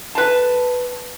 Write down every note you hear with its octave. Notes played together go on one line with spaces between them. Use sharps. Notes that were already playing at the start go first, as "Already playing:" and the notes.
B4 A5